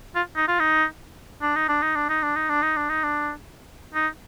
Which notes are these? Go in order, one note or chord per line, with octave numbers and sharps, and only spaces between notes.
F4
D#4
F4
D#4
D4
D#4
D4
D#4
D4
D#4
D4
D#4
D4
D#4
D4
D#4
D4
D#4